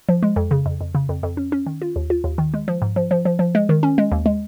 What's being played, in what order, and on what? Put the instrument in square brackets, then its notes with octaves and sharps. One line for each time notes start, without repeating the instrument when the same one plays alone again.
[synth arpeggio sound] F3
G#3
F2
C#3
F2
F2
C#3
F2
F2
C#4
C#4
D#3
F4
D#2
F4
D#2
D#3
G#3
F3
G#2
F3
F3
F3
F3
G#3
D#3
C#4
G#3
D#2
G#3